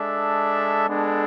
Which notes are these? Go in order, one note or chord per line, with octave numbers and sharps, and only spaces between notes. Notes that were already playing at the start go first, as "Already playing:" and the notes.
Already playing: G#3 D4 A4 E5
G#3 B3 D4 A4